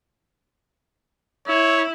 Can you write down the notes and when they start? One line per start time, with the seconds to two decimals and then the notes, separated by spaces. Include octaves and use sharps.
1.48 E4 C#5